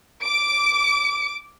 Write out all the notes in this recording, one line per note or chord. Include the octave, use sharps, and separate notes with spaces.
D6 D7